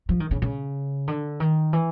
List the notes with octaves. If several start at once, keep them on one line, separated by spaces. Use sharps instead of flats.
F3
D#3
C#3
C#3
D3
D#3
E3